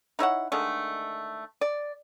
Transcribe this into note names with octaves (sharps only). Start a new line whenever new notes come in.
D#4 E4 C#5 F#5
D3 D#3 G#3 A3
D5